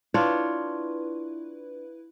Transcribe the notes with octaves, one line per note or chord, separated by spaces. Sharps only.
D4 E4 F4 B4 C#5